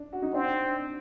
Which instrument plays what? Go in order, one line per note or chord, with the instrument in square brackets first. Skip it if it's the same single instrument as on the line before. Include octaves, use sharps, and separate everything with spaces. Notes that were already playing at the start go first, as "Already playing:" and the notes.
Already playing: [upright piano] D4
F#4
D#4
[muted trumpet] C4 [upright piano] D4